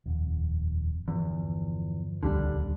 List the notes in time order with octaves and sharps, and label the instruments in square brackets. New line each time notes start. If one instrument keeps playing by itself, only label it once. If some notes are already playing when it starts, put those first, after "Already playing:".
[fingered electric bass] D#1 F2
[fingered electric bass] G1 F3 [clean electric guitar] E2
[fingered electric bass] D#1 C#2 A#3 [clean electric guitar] D3 G3 D4